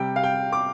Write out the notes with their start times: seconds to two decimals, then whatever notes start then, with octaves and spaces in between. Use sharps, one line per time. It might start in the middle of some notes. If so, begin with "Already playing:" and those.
Already playing: C3 G3 G5
0.16 F5
0.24 G5
0.52 D6